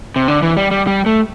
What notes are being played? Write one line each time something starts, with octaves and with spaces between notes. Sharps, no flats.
C3
D3
E3
G3
G3
G3
A3